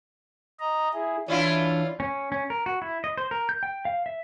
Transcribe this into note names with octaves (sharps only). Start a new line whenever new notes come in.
D#5 A#5
E4 G#4
E3 C#4 D4 E4 F4
C#4
C#4
A#4
F#4
E4
D#5
C5
A#4
G6
G5
F5
E5